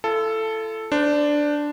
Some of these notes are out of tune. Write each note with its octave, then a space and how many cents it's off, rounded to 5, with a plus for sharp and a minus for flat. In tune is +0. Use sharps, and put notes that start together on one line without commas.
F4 -40 A4 +0
D4 +0 C5 -30